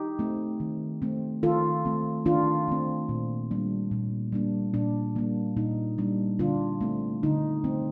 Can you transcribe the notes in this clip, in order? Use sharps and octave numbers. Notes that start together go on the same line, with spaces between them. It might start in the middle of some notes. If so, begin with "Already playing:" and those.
Already playing: D#4 G4
A3 C4
D#3
A3 C4
D#3 F4 A4
A3 C4
D#3 D4 F4
A3 C4
A#2
G3 A#3 D4
A#2
G3 A#3 D4
A#2 D4
G3 A#3 D4
A#2 D#4
G3 A#3 D4
D3 D4 F4
A3 C4
D3 D#4
A3 C4